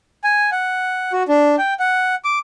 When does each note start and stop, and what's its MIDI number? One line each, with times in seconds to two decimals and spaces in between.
0.24 0.50 80
0.52 1.12 78
1.12 1.23 66
1.28 1.56 62
1.58 1.74 79
1.80 2.15 78
2.25 2.39 86